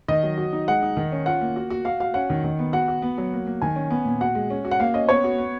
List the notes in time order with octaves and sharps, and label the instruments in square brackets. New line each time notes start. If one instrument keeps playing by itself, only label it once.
[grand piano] D#3 [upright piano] D#5
[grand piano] F#3
F#4
D#4
[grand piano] G#3 [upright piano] F#5
[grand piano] D#4
D#3
C#4
[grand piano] F4 [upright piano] F#5
[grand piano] A#3
F#4
F#4
[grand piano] F#4 [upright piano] F5
[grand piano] F#4 [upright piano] F5
[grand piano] C#4 [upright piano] F#5
[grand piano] D#3
D#3
B3
[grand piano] F#4 [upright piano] F#5
[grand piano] F#4
B3
F#3
A#3
A#3
[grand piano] D#3 [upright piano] G#5
[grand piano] C#4
B3
A#2
[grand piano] F#4 [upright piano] F#5
[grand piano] G#3
C#4
F#4
[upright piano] F#5
[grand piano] A#3 [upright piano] F5
[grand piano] C#4 [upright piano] D#5
[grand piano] B3 [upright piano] C#5
[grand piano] F#4
B3